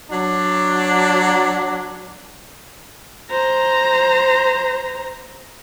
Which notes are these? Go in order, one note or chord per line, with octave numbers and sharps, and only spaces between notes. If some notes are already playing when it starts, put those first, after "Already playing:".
F#3 D4
C5 A#5